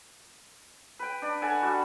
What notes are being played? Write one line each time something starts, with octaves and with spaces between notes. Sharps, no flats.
B4 G5
D4
A4 F#5 G#5
G3 F#4